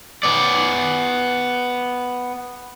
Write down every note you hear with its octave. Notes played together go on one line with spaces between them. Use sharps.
B3 D5